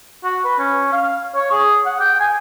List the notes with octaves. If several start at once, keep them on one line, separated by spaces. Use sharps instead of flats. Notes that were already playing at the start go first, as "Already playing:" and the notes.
F#4
B4
C#4
F5
C#5
G#4
F#5
G5
G#5